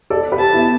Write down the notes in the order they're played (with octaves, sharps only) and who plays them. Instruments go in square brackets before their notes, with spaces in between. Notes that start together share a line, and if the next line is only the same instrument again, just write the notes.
[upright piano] A4 D5
G4 B4
[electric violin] A5
[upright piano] B3 E4